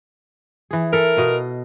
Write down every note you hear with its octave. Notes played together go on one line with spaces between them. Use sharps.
E3 G#4
A4 A#4 E5
B2 D#5 F5